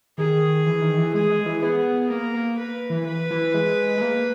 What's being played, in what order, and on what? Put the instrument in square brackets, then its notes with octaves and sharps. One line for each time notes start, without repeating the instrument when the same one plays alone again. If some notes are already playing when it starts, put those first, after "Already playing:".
[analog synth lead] D#3 [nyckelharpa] G#4
[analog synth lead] E3
D#3
E3
[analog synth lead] G#3 [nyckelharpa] G#4
[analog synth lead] G#3
E3
[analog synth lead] B3 [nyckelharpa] G#4
[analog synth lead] A#3 [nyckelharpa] A#4
[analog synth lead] A#3
[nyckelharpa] B4
[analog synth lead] E3
[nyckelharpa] B4
[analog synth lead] E3
G#3
G#3
A#3